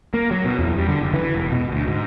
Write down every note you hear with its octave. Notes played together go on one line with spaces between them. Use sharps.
A#3
F#3
B2
E2
G3
D3
F#1
E3
E1
B2
D2
G#2